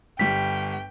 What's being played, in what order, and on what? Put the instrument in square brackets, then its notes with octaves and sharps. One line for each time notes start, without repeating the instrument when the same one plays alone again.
[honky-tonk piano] G1 G3 [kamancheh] G5 [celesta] B6